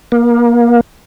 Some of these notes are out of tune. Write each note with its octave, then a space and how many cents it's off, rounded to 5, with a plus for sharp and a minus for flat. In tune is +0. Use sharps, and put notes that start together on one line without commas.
A#3 +30